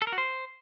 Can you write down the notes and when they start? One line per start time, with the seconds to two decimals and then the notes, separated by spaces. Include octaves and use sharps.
0.02 A4
0.07 A#4
0.12 F#4
0.18 C5